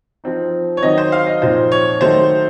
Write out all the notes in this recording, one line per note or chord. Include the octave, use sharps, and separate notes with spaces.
F3 C4 D#4
C#5
D#3 F#3 C4 D#4 D#5
C5
F5
D#5
A#2 F3 C4 D#4 C5
C#5
D#3 F#3 A3 D#4 C5